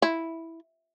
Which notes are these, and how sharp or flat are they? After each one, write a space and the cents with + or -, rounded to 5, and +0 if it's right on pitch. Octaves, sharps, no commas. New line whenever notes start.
E4 -5